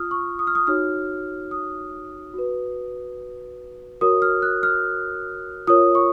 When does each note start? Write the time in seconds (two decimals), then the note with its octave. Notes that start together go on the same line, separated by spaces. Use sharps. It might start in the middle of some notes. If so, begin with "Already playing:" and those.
Already playing: F4 D#6 F6
0.11 C#6
0.39 D#6
0.47 F6
0.55 D#6
0.67 D#4 F#4 C#5 F6
1.51 D#6
2.34 F#4 B4
4.01 F#4 A#4 C#5 D#6
4.22 F6
4.42 F#6
4.63 F6
5.67 F4 A#4 C#5 D#6
5.95 C#6